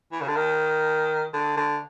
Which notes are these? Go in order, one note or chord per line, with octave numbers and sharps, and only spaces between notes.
E3
C#3
D3
D#3
D3
D3